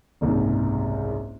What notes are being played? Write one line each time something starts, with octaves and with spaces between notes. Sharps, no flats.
F#1 C2 G#2